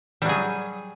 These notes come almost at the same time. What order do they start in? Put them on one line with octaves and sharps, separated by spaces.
G3 F#3 G#4